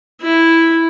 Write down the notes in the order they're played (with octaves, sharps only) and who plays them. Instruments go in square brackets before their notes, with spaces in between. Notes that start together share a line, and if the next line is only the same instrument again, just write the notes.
[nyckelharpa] E4